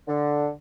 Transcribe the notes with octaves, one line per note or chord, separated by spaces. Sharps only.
D3